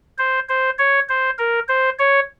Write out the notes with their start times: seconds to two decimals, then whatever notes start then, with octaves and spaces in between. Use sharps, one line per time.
0.18 C5
0.49 C5
0.78 C#5
1.09 C5
1.39 A#4
1.69 C5
1.99 C#5